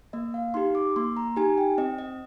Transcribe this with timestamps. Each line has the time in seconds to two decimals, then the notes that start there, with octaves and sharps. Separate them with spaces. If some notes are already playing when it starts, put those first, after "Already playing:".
0.13 A#3 D#5
0.34 F5
0.54 D#4 G4 C6
0.75 D6
0.96 A#3 C6
1.17 A#5
1.36 D#4 G4 G#5
1.58 G5
1.78 C4 D#5
1.98 D#5